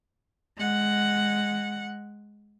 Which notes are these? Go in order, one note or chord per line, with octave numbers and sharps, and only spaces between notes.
G#3 F#5